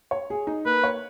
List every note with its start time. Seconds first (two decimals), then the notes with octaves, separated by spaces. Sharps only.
0.11 C#5
0.30 G#4
0.47 D#4
0.65 A#3 B4
0.84 C#5